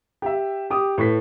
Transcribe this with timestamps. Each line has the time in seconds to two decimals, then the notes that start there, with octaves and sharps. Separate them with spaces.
0.22 G4 E5
0.70 G4 D6 D#6
0.98 A2 B4 B6